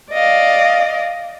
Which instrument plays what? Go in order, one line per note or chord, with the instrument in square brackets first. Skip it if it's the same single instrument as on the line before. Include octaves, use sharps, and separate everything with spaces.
[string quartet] D5 D#5 F5